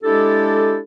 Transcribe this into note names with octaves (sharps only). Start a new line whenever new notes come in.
G#3 D4 E4 G4 A4